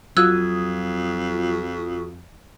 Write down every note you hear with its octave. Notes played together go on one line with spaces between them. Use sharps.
F2 F#3 F4 F#4 D#6 E6 F#6 G#6